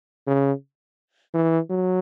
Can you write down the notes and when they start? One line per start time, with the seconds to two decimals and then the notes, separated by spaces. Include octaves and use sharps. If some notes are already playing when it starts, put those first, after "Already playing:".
0.27 C#3
1.34 E3
1.70 F#3